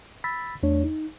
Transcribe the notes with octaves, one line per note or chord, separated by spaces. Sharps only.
B5 E6 A6 B6
E2 A3 D4 C#5
D#4